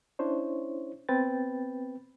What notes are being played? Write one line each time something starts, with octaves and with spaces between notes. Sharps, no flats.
C#4 D4 E4 C5 C#5
B3 C4 B4 G5 A6